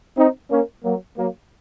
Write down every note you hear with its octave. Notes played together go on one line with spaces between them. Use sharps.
C4 D#4
A#3 C#4
F#3 A#3
F#3 A#3